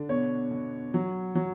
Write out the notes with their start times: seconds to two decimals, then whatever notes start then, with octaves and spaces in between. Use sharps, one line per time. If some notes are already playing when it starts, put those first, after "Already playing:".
Already playing: D3 D4
0.09 B2 C#5
0.51 B2
0.94 F#3
1.35 F#3